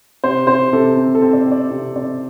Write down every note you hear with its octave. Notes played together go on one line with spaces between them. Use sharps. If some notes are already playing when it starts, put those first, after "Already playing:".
C3 C5
C3 C5
C3 A4
C4
A4
C4
D5
C4
D5
C3
C4 D5